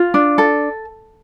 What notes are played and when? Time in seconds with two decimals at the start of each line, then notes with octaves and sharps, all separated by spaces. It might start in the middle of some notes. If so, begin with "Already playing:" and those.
Already playing: F4
0.14 D4
0.38 A4